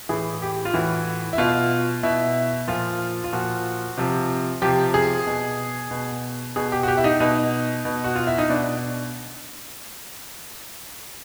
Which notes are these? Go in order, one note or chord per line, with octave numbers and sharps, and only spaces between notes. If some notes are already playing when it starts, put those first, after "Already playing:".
A2 E3 G#4
G4
F4
A2 E3 F#4
E4
B2 F4
B2 E4
A#2 F3 F4
F4
A#2 F3 F#4
C3 F3
C3 F3 G4
G#4
B2
B2
B2 G#4
G4
F#4
G4
E4
D#4
B2 D#4
B2
F#4
F4
E4
D#4
B2 D4